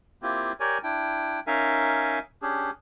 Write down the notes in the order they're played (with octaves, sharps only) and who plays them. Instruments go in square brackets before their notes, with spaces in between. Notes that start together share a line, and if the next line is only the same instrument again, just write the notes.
[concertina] A#3 C4 E4 F4 G4
G4 A#4 C#5 D5 G#5
D4 E4 G5
C#4 D#4 A#4 E5 F5 G#5
C#4 D4 G4 G#4